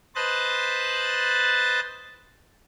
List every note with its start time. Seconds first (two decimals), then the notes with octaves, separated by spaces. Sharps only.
0.15 B4 C5 D#5 A5 F#6 A6